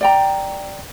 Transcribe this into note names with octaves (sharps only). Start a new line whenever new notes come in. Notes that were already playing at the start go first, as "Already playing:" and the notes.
D5 G5 A#5